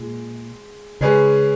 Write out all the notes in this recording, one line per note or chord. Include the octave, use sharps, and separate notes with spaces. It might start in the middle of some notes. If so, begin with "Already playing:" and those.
Already playing: A#2 G#3
C#3 G#3 C#4 G#4 B4